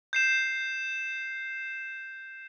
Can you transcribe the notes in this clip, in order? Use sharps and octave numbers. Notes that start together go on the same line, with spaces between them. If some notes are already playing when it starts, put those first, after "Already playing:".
G6 C7 E7